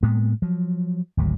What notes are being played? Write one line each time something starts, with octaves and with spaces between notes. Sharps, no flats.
A2 G#3 A#3 B3
F3 F#3
G#1 D2 D#3 F#3